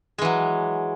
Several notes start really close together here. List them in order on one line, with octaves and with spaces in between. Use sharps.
G#3 E3 F#3